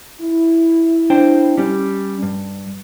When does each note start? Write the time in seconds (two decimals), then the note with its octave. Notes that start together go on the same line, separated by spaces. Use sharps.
0.21 E4
1.10 D4 C5 G5
1.57 G3 C#4 G4
2.23 G2